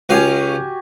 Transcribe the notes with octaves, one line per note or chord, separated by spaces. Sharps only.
C#2 C#4 F#4 G4 F5 G#5